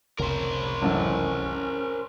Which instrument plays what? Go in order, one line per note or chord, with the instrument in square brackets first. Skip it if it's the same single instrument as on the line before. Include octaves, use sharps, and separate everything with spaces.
[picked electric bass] F1 C2 C#3 [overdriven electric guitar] A#4 C5
[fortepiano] A1 F#2 [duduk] C#4